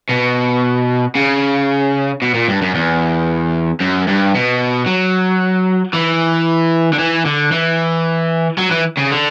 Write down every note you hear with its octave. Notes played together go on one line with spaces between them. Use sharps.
B2
C#3
B2
A#2
G2
F#2
E2
F#2
G2
B2
F#3
E3
D3
E3
D3
E3
F#3
E3
C#3
D3